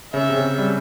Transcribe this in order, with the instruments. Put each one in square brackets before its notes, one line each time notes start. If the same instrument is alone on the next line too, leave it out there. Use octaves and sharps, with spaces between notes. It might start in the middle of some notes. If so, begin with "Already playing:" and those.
[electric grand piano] C#3 [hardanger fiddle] E5
[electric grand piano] C3
C#3
G3